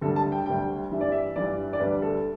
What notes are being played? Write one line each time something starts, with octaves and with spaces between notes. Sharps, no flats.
D2 D3 G3 A4
A5
G5
D2 D3 G3 G5
G2 E3 G3 E5
D5
E5
G2 E3 G3 D5
D5
D2 D3 G3 B4
A4